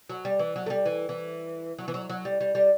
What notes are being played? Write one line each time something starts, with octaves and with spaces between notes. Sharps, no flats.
F#3
G3
E3
F#3
A3
G3
E3
E3
F#3
E3
F#3
F#3
G3
G3
G3